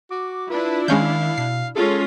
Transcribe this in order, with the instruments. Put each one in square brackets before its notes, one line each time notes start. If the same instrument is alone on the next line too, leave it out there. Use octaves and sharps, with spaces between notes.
[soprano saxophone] F#4 [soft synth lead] D6
[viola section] D4 E4 [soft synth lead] F4 [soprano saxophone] B4
[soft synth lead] D#3 [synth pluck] G#3 C#4 G6 [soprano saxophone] F5
[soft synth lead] B2 [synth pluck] C7
[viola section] G#3 C#4 F4 [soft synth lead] G#4 [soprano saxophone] A4